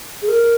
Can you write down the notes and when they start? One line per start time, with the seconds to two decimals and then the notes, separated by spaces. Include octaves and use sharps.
0.22 G#4
0.28 A#4